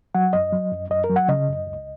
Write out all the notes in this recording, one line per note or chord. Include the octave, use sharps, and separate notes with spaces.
F#3 F#5
F#2 D#5
F#3
F#2
F#2 D#5
A#4
F#3
F#5
C#3 D#5
F#2
C#2